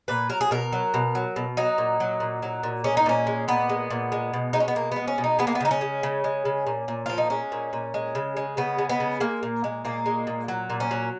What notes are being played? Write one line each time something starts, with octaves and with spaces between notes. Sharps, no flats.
A#2 B4
F#3 A#4
G#4
B2 A#4
F#3
B2
F#3
B2
F#3 D#4
A#2
F#3
A#2
F#3
A#2
G#3 C#4
D#4
A#2 C#4
G#3
A#2 B3
G#3
A#2
G#3
B2
G#3 D#4
C#4
B3
B2 A#3
G#3 B3
C#4
B2
D#4
G#3 B3
A#3
B3
C#3 D#4
C#4
G#3
C#3
G#3
C#3
A#2
A#2
F3 F4
D#4
G#3 C#4
A#2
A#2
G#3
C#3
G#3
C#3 B3
G#3
B3
C#3
G#3 A#3
A#2
G#3
A#2 A#3
G#3
A#2
F#3
A#2
C#4
F#3